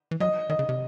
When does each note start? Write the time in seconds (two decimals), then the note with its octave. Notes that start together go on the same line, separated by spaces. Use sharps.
0.11 E3
0.20 F#3 D#5
0.49 D#3 D#5
0.59 C#3
0.69 C3